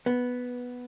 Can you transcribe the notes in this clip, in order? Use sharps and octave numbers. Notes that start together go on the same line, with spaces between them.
B3